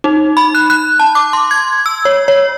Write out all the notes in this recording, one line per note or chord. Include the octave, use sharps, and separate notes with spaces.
D#4
B5
F#6
F#6
A5
D6
C6
G#6
E6
C#5
C#5